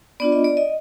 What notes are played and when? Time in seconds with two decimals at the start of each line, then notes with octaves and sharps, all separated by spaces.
0.20 B3 D4 F4 D5
0.32 D#5
0.44 D5
0.57 D#5